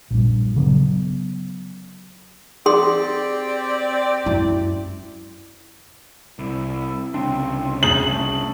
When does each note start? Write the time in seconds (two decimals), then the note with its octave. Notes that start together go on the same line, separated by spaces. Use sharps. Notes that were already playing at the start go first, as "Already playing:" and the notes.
0.11 A#1 G2
0.56 C#3 F#3 B3
2.66 C4 G4 G#4 D5 C6
4.26 F#2 E4
6.39 C2 E4
7.14 C2 C#3 C4 D4
7.83 G#4 F#7
8.10 A3